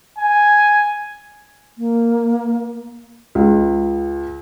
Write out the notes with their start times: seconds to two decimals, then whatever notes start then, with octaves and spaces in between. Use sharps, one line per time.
0.18 G#5
1.78 A#3
3.35 C#2